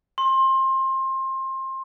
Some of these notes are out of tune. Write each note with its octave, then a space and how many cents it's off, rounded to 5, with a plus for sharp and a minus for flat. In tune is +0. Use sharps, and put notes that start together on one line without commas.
C6 +25